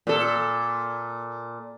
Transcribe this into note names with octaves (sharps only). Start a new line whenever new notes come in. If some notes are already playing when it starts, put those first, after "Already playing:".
A#2 A4